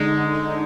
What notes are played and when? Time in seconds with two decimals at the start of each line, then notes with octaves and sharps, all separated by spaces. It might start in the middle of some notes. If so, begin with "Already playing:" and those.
Already playing: D3 G#3 D#4
0.13 D#4
0.35 D#4